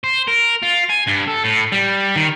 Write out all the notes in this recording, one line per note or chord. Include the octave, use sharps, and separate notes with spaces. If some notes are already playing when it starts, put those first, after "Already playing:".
C5
A#4
F4
G#5
G2
A4
A2
G3
D#3